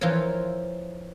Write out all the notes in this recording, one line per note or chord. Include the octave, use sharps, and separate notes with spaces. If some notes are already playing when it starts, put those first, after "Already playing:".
E3 F3 F4 A#4 C#5